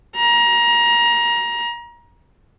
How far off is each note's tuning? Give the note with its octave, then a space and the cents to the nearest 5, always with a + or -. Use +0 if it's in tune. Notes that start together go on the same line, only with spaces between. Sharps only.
A#5 +25